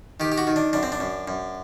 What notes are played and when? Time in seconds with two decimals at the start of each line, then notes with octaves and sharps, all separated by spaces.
0.20 D#3 G4
0.32 G4
0.38 F#4
0.47 D#3
0.56 D4
0.73 F#2 D4
0.83 C4
0.92 D4
1.00 F#2
1.28 F#2